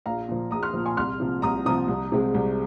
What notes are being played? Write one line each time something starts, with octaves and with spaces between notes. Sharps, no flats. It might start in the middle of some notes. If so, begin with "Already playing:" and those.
A#1 F5 A#5
A#2 F3
A#1 A#5 D#6
C6 F6
A#2 F3
G#5 C6
C2 C6 F6
C3 F3
C2 A#5 D#6
C3 F3 A#5 D#6
C2
C3 G#3 C4
C2